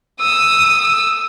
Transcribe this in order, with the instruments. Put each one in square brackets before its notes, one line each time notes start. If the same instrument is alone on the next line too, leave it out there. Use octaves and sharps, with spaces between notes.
[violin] D#6 [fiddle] E6